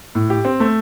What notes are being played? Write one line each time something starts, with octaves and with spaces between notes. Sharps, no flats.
A2
G4
C4
A3